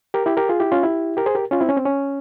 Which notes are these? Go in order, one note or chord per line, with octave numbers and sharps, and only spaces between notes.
G4 A#4
E4 G4
G4 A#4
F4 G#4
E4 G4
C#4 F4
E4 G4
G4 A#4
G#4 C5
G4 A#4
C#4 F4
C4 E4
C#4
C4
C#4